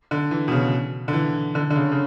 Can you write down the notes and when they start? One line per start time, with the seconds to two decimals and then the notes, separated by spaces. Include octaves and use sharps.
0.11 D3
0.31 E3
0.48 B2
0.51 C#3
1.08 D3
1.13 E3
1.55 D3
1.70 D3
1.76 C#3
1.92 C#3